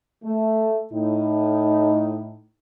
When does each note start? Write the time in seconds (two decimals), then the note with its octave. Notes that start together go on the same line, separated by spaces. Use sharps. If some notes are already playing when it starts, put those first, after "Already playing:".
0.24 A3
0.93 A2 D#4